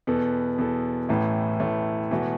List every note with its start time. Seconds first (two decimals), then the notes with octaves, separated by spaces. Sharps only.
0.07 E2 B2 B3 A4
0.58 E2 B2 B3 A4
1.09 A1 A2 E3 A3
1.60 A1 A2 E3 A3
2.11 E1 E2 E3 A3 F#4